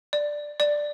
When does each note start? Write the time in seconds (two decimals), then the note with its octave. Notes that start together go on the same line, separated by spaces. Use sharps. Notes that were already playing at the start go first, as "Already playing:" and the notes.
0.13 D5
0.60 D5